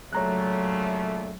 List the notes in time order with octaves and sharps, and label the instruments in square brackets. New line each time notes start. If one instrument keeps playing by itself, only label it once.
[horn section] A#2 C#3 A3 [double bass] F#3 [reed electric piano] C#5 A#5 F#6